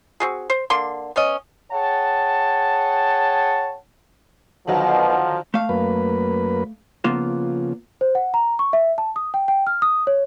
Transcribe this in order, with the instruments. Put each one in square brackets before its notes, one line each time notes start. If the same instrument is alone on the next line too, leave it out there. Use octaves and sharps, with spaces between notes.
[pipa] C4 F#4 G#4
C5
D3 A#3 C6
B3 C#4 D#5
[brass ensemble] G#4 C#5 F#5 G5 A5
[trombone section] B1 B2 [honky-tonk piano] D3 D#3 F#3 [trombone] F3 [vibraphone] F#5
[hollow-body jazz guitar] A3 F5
[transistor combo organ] F#2 A#3 B4
[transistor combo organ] C#3 F3 [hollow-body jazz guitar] A#3 B3 F4
[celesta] C5
F#5
A#5
C#6
E5
A5
D#6
G5
G5
F6
D#6
C#5